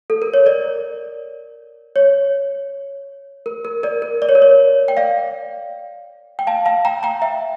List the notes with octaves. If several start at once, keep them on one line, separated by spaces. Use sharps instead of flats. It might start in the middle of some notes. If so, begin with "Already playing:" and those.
A4
A#4
C#5
A#4 D5
C#5
A#4
A#4
A#4 D5
A#4
D5
C#5
A#4
C#5
G5
D5 F5
G5
F5 A5
F5 A5
G5 A#5
G5 A#5
E5 G5